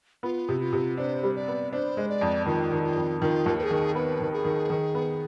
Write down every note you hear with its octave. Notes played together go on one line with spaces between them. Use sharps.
B3 F4
C3
F4
C3
D4 C5
G3
D5
B3
D4 C5
G#3
D5
F2
D#3 F4
D#3
F4
F2
D#3 F4
D#2
B4
G#4
D#3
B3 B4
D#3
G#4
D#3
D#3
B3